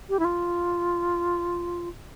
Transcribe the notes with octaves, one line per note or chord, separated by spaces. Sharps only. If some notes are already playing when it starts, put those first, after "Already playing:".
G4
E4
F4